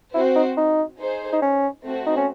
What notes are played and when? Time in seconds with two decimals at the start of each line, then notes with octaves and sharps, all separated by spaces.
0.14 C4 E4 F#4 C5
0.35 D#4
0.57 D#4
0.99 D#4 G#4 C5
1.32 D#4
1.42 C#4
1.84 A3 C4 F#4
2.06 D#4
2.17 C#4